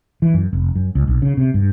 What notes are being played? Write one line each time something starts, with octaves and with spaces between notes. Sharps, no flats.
E3
F#2
F1
F#2
C#2
B1
C#3
C3
G2